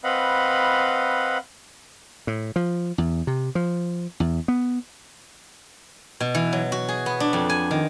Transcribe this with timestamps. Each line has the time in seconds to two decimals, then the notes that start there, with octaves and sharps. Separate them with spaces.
0.04 C4 B4 D#5 F5 F#5 B5
2.27 A2
2.56 F3
2.98 E2
3.27 C3
3.55 F3
4.20 E2
4.48 B3
6.20 B2
6.35 E3
6.53 F#3
6.72 F#4
6.89 G#4
7.06 B3
7.20 D4
7.33 F2
7.50 G#5
7.71 D#3